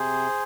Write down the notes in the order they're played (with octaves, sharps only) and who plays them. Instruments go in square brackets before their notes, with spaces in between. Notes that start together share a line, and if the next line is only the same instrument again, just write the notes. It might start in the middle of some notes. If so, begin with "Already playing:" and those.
Already playing: [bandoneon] C3 G#4 C5